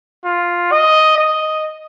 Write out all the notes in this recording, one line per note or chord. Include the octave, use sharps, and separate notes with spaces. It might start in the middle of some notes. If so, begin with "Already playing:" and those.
F4
D#5
D#5